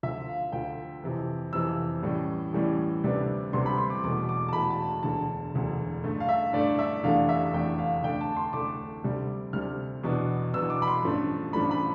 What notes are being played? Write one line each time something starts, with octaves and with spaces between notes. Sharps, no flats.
D2 D3 F3 E5
F5
D2 D3 F3 G5
F2 C3 E3
F2 C3 E3 E6
A1 A2 E3 G3
A1 A2 E3 G3
D2 C3 G3 B3 D4
D2 C3 G3 B3 D4 C6
B5
C6
D6
E1 E2 B2 A3 D6
D6
A5
E1 E2 B2 A3 B5
A5
E1 D2 D3 A5
E1 D2 D3
G2 D3 A3
F5
E5
G2 D3 A3 D5
E5
F1 E2 D3 A3 D4 F5
E5
F1 E2 D3 A3 D4 G5
F5
D2 D3 A3 D4 G5
A5
C6
D2 D3 A3 D4 D6
D2 C3 G3
D2 C3 G3 F6
E2 B2 B3 D4
E2 B2 B3 D4 E6
D6
B5
C6
A1 G2 F3 A3 D4
A1 G2 F3 A3 D4 B5
B5